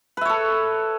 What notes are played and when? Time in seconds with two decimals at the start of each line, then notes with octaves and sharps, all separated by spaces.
0.17 B4
0.21 E5
0.25 C#5
0.30 A4